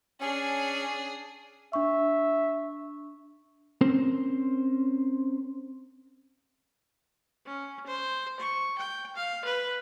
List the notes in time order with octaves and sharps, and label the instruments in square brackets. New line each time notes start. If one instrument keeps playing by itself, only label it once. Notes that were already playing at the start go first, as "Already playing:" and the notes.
[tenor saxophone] C#4 [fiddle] D4 G#4
[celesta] D4 C#6 [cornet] E5
[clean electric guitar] C4 C#4 A#4 C5
[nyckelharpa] C#4
C5
C#6
G5
F5
B4